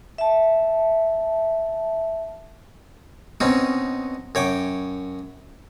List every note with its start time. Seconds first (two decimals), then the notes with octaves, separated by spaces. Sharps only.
0.18 E5 A5
3.40 B2 C4 C#4 D#4
4.35 F#2 C#5 G5 D6